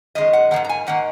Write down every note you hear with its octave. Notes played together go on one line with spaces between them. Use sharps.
F#2 D#3 G#3 D#5
F#5
D#3 A#3 F#5
G#2
A#5
G#5
G#2 D#3 A#3 F#5